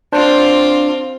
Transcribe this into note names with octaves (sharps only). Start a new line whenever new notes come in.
C4 D4 F4 C5